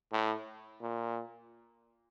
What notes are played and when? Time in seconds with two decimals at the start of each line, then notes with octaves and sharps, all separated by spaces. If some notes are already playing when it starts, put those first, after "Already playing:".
0.12 A2
0.81 A#2